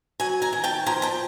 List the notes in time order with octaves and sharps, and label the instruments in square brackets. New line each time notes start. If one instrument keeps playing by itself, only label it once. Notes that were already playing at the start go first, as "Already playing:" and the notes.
[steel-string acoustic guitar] F#3 F#5 G#5
G#5 A#5
D#3
G5 A5
F3 G#5 A#5
G5 A5